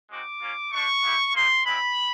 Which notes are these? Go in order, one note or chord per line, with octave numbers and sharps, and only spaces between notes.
G#3 C4 D#4 F#4 D6
A#3 C#4 F4
A3 D4 G4 C#6
B3 E4 G4
A#3 D#4 G4 C6
G#3 C4 E4 B5